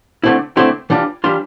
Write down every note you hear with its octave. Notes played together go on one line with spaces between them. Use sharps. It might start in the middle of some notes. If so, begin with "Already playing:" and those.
D3 A3 C4 E4
D3 A3 C4 E4 C6
E3 G3 D4 F4
E3 G3 D4 F4 C6